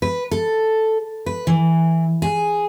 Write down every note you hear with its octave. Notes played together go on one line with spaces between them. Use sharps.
B4
A4
B4
E3
G#4